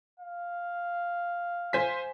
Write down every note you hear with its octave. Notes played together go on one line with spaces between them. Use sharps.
F5
C5 G#5 B6